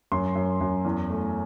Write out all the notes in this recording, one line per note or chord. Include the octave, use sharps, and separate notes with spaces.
F#2 C6
F#2
F#2
E2
A3